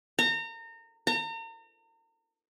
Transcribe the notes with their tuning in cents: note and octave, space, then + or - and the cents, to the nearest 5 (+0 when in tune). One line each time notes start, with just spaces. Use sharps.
A#5 -30
A#5 -40